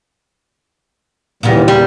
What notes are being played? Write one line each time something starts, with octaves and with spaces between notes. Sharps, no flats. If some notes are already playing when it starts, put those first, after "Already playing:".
D#2 A#2 C#3 E3 G3 B3
E2 G3